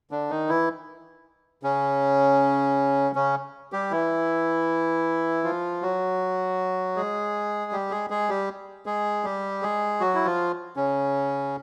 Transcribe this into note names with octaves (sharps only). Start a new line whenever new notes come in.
D3 D4
D#3 D#4
E3 E4
C#3 C#4
C#3 C#4
G3 G4
E3 E4
F3 F4
F#3 F#4
G#3 G#4
G3 G4
G#3 G#4
G#3 G#4
G3 G4
G#3 G#4
G3 G4
G#3 G#4
F#3 F#4
E4
F3 F4
C#3 C#4